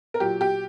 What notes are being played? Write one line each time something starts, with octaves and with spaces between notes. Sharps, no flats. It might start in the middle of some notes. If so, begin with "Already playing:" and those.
A#4
A#2 F#3 G4
G4